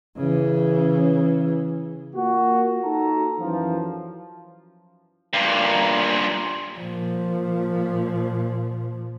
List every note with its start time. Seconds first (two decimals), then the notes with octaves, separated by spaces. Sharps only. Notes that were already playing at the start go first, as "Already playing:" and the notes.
0.17 C#3 E3
2.15 A#3 F4 F#4
2.84 D#4 F#4 A4 A#5
3.39 F#2 E3 F3
5.33 G2 A#2
6.79 A#2 F3